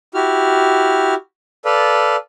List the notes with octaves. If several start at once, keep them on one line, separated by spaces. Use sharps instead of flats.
E4 F#4 G4 F6
A4 B4 D5 F5